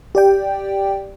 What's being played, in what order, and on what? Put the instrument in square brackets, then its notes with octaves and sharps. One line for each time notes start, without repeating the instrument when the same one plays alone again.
[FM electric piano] G4 D5 G5